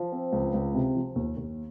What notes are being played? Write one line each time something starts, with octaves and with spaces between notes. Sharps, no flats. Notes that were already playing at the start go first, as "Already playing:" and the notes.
Already playing: F3
C4
C#2
C#2
C3
F3
D#2
D#2